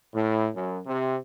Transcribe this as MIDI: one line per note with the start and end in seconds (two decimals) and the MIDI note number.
0.14 0.47 45
0.55 0.79 42
0.86 1.16 48